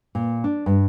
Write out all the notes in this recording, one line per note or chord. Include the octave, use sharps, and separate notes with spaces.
A#2
D4
G2